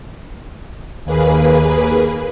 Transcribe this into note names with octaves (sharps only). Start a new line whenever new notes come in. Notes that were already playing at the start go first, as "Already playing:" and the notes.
D#2 A#3 G#4 B4